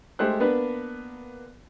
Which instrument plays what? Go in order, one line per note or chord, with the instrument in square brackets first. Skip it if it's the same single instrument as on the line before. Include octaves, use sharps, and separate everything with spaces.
[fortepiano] G#3 A3 G4 C5 F#6
A#3 B3 D4 B4